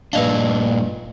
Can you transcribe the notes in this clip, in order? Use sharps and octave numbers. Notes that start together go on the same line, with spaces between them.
G2 A#2 D4 B4 D#5 F5